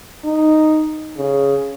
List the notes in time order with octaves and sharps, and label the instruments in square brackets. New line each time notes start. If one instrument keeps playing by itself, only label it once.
[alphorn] D#4
C#3